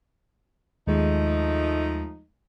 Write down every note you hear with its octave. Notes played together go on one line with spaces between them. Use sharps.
D#2 F3 G#3 A3 D#4